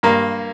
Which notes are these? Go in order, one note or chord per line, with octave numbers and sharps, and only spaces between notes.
G2 A#3